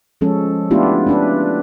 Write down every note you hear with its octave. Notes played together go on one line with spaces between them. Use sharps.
F3 G#3 C#4 A4
A3 B3 D4 E4 F4 G4
C#4 D4 B4